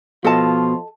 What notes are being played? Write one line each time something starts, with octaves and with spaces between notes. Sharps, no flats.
B2 F3 F4 A4 D#5 A5